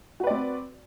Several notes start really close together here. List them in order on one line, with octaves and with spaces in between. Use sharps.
F#4 B4 D5 C4